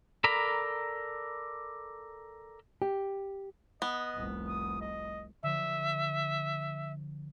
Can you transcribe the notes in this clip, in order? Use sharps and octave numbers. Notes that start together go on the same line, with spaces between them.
A4 A#4 D5 A#5 B5
G4
B3 D#5
F1 C2
D#6
D#5
D3 F3 E5